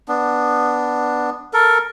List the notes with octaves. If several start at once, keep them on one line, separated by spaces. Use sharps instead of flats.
B3 D4
A4 A#4